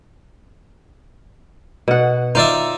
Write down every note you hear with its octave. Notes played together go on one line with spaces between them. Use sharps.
B2 F#5
D#4 F4 C5 D5 E5